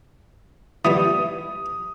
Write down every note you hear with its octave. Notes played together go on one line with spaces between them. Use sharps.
E3 G3 B3 D#6